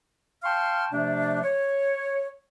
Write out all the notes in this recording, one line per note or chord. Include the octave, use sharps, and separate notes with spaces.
F5 G5 A5 C6 C#6 F6
C3 F3 A3 D4
C#5